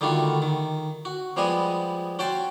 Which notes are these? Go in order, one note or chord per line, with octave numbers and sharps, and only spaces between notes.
D3 D#3 G3 A3 F4 F#4
D#3
F#4
F3 G3 G#3 B3 G#4 D#5
C#4 F#4 G5 A5 C6